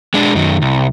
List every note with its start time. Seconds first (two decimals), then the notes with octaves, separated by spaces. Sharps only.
0.14 G#3 D4
0.35 F#2 D#3
0.62 C2